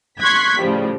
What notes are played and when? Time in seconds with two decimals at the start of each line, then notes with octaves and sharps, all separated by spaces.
0.20 C6 C#6 F#6 G#6 B6
0.59 A2 C#3 F3 G3